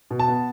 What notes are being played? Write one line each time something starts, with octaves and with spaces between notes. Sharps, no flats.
B2
A5
B3